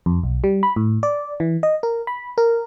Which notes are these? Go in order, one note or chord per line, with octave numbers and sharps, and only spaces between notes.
F2
B1
G3
B5
A2
D5
E3
D#5
A#4
B5
A#4